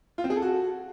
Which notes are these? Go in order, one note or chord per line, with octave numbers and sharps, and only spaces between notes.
F4
C4
G#4
A4
F#4